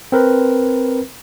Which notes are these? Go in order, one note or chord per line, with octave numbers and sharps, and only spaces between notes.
C4 A#4 B4